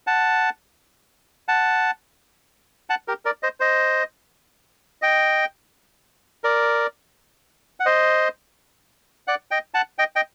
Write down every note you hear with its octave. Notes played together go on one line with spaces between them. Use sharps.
F#5 A5
F#5 A5
F#5 A5
G4 A#4
A#4 D5
C5 D#5
C5 D#5
D#5 G5
A#4 D5
F#5
C5 D#5
D5 F#5
D#5 G5
F#5 A5
D#5 G5
D#5 G5